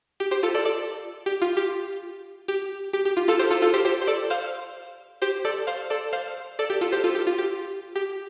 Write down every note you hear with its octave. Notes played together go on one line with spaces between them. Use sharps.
G4
G4 C5
F4 A4
A4 D5
A4 D5
G4
F4
G4
G4
G4
G4
F4
F4 A4
G4 C5
F4 A4
F4 A4
G4 C5
G4 C5
C5
A4 D5
C5 F5
G4 C5
A4 D5
C5 F5
A4 D5
C5 F5
A4 D5
G4
F4 A4
G4 C5
F4 A4
G4
F4
G4
G4